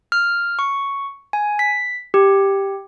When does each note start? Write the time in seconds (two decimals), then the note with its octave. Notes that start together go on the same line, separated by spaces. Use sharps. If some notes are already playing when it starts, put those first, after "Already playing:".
0.12 F6
0.59 C#6
1.33 G#5
1.59 B6
2.14 G4